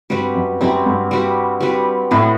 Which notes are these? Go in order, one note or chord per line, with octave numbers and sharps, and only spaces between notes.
G2 G3 C4 F#4 B4
F#2
F#2 G3 C4 F#4 B4
G2
G3 C4 F#4 B4
G3 C4 F#4 B4
A2 F#3 B3 F#4